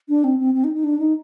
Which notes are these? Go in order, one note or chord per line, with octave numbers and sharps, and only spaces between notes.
D4
C4
C4
C4
D#4
D#4
D4
D#4